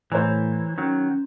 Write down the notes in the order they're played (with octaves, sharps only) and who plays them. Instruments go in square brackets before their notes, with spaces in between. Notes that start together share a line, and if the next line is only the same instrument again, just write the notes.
[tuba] A2 [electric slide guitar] E3 [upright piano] C5 C#5 A#5
[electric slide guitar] D#3 F#3 [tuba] C#4